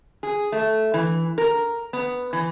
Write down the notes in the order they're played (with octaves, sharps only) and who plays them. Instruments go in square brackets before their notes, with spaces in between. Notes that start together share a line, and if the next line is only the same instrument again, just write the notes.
[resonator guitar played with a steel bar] G#4
A3
E3
A#4
B3
E3